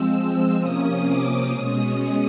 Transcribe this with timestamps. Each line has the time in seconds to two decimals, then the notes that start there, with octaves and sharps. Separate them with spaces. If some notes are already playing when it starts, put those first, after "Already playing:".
Already playing: F3 G#3 C4 E6
0.14 E6
0.60 C3 F3 A#3 C#4 D#6
1.06 D6
1.51 B2 G#3 C#4 D#6
1.97 D#6